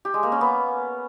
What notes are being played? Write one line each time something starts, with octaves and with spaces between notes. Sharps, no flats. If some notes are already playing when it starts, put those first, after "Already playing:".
G4
G#3
A#3
C#4
B3